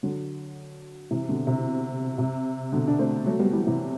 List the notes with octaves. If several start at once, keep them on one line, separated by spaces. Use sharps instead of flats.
D3 F#3
C3 E3
B2 D3
C3
C3
B2 D3
D4
A3 C4
F#3 A3
G3 B3
E3 G3
C3 E3